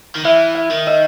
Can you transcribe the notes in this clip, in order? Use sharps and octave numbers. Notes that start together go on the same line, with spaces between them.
D#3
E3 E5
E5
D#3
D#5